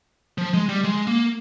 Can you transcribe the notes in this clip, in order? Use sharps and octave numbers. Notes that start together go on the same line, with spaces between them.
F3
G#3
G3
G#3
A#3